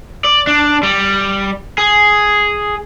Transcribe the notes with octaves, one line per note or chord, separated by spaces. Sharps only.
D5
D4
G3
G#4